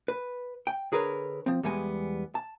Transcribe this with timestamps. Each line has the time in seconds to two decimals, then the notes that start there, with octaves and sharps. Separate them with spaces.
0.08 B4
0.67 G5
0.92 D3 G#4 A#4 B4 C#5
1.46 F3 C4
1.63 E2 G3 G#3 B3 G#5
2.35 A5